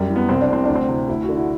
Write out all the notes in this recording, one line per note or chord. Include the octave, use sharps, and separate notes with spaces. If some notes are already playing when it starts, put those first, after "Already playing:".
Already playing: F#2 G3
E3
B3
C2 C4
D4
C3 E3 C4
D2 D4
C4
C3 E3
D2 E4
F#4
D3
E4